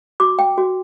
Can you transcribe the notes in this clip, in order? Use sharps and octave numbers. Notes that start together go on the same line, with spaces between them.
F#4 D6
G5
F#4